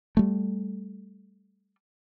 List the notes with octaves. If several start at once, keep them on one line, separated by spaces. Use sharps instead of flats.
G3 A3